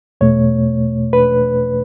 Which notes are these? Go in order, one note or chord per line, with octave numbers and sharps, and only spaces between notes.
E2 B2 A3 C#5
B4